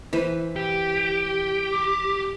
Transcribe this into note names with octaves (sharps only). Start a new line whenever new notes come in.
E3 B4 C5
G4
D6